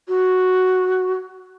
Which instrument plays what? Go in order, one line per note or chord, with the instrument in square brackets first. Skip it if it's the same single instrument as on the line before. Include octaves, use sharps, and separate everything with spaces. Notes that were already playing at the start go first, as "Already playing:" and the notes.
[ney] F#4